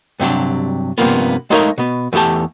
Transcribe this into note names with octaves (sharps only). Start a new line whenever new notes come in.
G2 C3 F#3 D4
G2 C3 F3 A#3 B3
G#3 A3 D#4 A#4 C#5 F5
B2 B3
E2 E3 A3 G4 A5